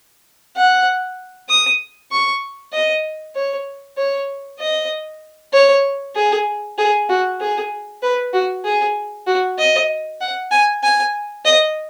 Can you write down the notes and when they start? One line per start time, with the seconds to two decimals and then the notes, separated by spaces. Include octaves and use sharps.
0.57 F#5
1.49 D#6
2.12 C#6
2.73 D#5
3.36 C#5
3.98 C#5
4.60 D#5
5.53 C#5
6.16 G#4
6.78 G#4
7.09 F#4
7.40 G#4
8.03 B4
8.33 F#4
8.65 G#4
9.27 F#4
9.59 D#5
10.21 F#5
10.52 G#5
10.83 G#5
11.45 D#5